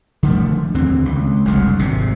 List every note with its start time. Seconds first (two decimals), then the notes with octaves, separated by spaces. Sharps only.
0.23 D3 F3 A3
0.74 D#2 D3 C4
1.05 C#2
1.45 F#1 C2 F2 D3
1.79 G#1 C3